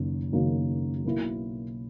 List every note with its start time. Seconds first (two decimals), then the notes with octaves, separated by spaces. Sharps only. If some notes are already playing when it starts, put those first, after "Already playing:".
Already playing: F#1 F#2 D#3 A#3
0.32 F#1 F#2 D#3 A#3
1.05 B1 B2 A#3 E4